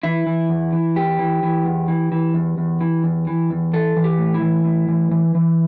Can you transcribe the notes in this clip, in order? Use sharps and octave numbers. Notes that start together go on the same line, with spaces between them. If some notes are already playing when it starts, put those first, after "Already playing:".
E3 E4
E3
E2
E3
E2 G4
E3
E3
E2
E3
E3
E2
E2
E3
E2
E3
E2
E3 A4
E3
G4
A2
E4
E3
A2
E3
E3
E3